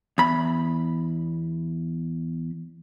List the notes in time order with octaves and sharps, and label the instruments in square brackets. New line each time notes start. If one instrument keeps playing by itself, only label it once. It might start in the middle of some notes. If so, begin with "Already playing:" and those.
[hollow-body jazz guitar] E2 B5